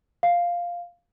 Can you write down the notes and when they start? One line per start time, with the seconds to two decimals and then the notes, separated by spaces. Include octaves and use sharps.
0.23 F5